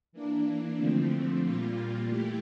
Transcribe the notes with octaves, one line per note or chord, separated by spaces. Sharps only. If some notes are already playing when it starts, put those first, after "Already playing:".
E3 A#3 D4
D3 F3 A3 C4
A#2 G3 A#3 F4
E3 A3 E4 G4